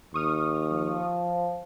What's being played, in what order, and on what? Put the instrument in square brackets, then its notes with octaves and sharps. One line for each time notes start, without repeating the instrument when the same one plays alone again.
[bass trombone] D#2 [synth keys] C#6 D#6 F6
[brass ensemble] F3